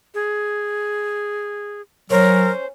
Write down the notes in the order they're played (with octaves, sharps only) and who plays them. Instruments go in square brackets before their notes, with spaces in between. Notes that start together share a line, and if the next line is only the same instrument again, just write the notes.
[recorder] G#4
[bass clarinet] F#3 [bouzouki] C#4 [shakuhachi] A#4 [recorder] C5